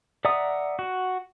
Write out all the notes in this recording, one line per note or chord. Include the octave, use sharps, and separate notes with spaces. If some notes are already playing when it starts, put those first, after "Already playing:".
D5 E5 F#5 A#5 D#6
F#4